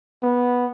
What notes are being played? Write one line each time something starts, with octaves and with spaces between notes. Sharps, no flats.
B3